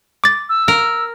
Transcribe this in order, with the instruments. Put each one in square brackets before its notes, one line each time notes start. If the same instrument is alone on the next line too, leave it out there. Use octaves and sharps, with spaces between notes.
[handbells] D6 A6
[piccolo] E6
[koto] A#4